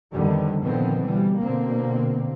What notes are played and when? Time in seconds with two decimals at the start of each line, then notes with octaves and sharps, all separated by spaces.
0.12 F2 D3 D#3 G3 B3
0.62 A#2 D3 D#3 F3 B3 C4
1.05 B2 E3 G3
1.40 B2 D3 A#3 C4